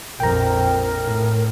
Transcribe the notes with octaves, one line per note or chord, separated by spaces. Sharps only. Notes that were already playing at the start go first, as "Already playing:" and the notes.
A#1 F2 A#4 G5 A#5
A2